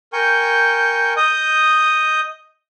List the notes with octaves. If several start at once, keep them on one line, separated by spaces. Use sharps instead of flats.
A#4 G5 G#5 C#6 G6
D#5 D#6 G6